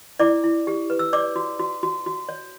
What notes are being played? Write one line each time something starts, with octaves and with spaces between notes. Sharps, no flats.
E4 D5 D6
E4
G4
B4
E6
C#5 D5 D6
F#4
F#4
F#4
F#4
C#5